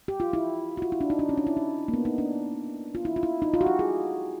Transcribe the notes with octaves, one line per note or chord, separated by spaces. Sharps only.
G4
F4
E4
F#4
F4
E4
D4
D#4
D4
C#4
D4
E4
D#4
A#3
B3
D#4
D4
F4
E4
F4
E4
D#4
F4
F#4
G4
G#4